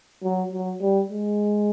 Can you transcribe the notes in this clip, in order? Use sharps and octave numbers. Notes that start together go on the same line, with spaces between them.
F#3
F#3
G3
G#3